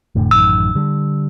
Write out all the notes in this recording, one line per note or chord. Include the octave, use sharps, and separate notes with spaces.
F1 A2 D3
A1 F#2 D#3 E6
D3 G3